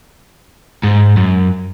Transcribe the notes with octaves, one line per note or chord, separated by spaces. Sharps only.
G#2
F#2